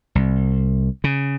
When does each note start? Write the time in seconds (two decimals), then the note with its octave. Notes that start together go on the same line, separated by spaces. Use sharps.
0.15 C2
1.04 C#3